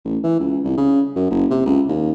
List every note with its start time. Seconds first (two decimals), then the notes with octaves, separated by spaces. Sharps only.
0.05 A1
0.24 E3
0.40 C#2
0.64 C2
0.77 C#3
1.16 F#2
1.30 F#1
1.50 C3
1.66 C#2
1.89 D#2